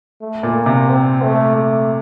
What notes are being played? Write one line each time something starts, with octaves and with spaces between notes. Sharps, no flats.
A3
A#2
A#3
C3
C4
A3
A3